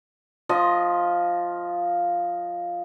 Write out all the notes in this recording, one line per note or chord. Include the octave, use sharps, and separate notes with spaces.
F3 D#5